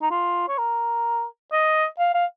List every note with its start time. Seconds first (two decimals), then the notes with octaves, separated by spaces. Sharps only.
0.02 D#4
0.11 F4
0.48 C#5
0.58 A#4
1.52 D#5
1.99 F5
2.14 F5